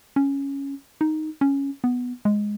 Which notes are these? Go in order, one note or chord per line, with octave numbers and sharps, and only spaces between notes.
C#4
D#4
C#4
B3
G#3